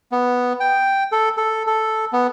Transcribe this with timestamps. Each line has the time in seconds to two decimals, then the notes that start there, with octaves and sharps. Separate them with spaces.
0.12 B3
0.60 G5
1.12 A4
1.37 A4
1.67 A4
2.13 B3